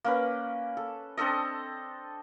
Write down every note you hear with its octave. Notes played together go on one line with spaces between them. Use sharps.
A#3 C#4 B4
A4
C4 D4 A4 D#5